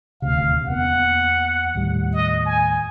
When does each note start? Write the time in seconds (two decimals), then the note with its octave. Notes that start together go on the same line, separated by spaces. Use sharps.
0.22 D#1 D2 C3 F5
0.68 E2 A#3 B3 F#5
1.75 D#2 A2 G3
2.13 D#5
2.46 G#5